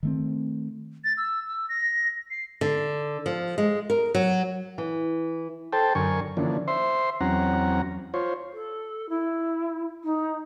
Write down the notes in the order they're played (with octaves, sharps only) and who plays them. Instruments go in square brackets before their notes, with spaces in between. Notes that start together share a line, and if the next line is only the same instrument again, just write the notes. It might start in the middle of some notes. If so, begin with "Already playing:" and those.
[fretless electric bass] D#3 A3 C4
[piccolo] A6
E6
E6
A#6
C7
[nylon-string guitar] D3
F3
G#3
A#4
F#3
E3
[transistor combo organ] A4 C5 G5 A5
F#2 D3 A#4 G#5 C#6
D3 E3 F3 A#3 C#4 D4
C5 E5 C6
E2 F#3 C4 C#4 F#5 A#5
F4 C5 C#5
[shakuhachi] A4
E4
D#4